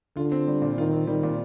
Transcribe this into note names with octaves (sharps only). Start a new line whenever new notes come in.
D3 F4
C4
G3
A#2
D#3 F4
C4
D#3 G3
A#2